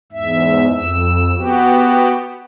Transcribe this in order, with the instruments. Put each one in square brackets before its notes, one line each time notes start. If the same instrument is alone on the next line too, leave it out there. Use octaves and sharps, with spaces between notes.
[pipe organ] E2 G#2 E5
F2 E6
B3 F#4 G4